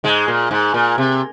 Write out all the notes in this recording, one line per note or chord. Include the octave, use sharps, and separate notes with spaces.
G#2 G#3
A#2
G#2
A#2
C3